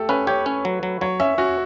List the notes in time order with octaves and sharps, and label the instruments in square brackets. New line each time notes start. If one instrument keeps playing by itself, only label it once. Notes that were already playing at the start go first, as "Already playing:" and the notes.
Already playing: [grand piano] A3 G4 A4
[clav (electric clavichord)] C#4 [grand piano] B4
[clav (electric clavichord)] G4 [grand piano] C#5
[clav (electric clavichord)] C#4
F#3
F#3
[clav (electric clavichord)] F#3 [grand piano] C#5
[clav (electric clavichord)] C#4 [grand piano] E5
[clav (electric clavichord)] C#4 [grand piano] F#4